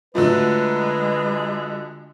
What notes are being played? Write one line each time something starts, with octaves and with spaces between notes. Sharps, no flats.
D3 F#3 G#3 A3 F4 B4